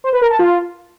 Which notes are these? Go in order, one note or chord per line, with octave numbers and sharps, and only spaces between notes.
C5
B4
A#4
A5
F4